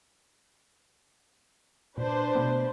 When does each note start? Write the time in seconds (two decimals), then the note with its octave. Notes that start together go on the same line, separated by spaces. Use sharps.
1.97 A#2 D4 B4 C5
2.35 B2 A3 B3